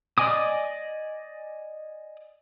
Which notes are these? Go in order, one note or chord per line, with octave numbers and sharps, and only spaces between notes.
D5 D#5 G#5 D6 D#6